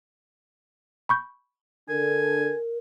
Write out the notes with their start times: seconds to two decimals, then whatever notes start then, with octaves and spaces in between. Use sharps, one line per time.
1.09 B5 C#6 G6
1.89 D3 D4 A4 A#4 G#5